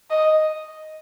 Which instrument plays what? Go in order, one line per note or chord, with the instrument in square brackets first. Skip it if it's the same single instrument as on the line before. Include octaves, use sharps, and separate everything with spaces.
[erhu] D#5